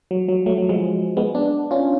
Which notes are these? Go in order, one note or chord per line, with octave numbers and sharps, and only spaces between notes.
F#3
F#3
F#3 A3
F#3
F3 G#3
G#3 B3
B3 D4
C#4 F4